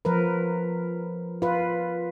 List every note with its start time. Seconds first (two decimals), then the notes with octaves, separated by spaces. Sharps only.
0.05 F3 A#4 B4
1.42 F4 B4